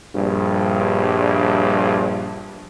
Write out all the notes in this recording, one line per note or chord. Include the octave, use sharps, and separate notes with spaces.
A#1 G2